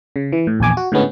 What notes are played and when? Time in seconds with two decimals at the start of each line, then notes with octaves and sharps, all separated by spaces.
0.16 C#3
0.33 E3
0.47 A2
0.60 A#1 E2 G#5 D6
0.77 F#4
0.92 A2 D3 G#3 B3 C#4